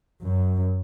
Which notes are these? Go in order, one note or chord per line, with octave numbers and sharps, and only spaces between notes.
F#2